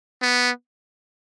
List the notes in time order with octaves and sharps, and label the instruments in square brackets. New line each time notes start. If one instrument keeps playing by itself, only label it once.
[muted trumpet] B3